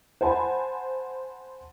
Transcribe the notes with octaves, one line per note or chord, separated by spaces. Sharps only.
C5 F#5 G#5 A5 B5